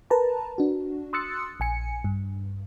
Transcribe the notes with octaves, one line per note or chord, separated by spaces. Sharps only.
A#4 B4 A5 A#5
D4 F#4
C6 D#6 E6 F#6 A6 C#7
A#1 G#5 C#7
G2